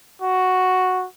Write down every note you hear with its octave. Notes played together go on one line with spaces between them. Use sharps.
F#4